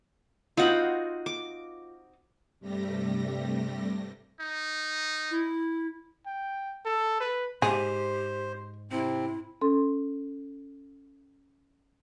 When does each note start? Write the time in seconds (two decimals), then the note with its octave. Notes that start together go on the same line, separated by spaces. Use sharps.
0.57 C4 D#4 F4 F#4 F#5 B5
1.26 D6
2.60 G2 C3 G3 A3 G4 A#6
4.40 D#4
5.31 E4
6.26 G5
6.85 A4
7.21 B4
7.62 G#2 G4 G#4 C5
8.91 C3 C4 E4
9.61 C#4 A4 C6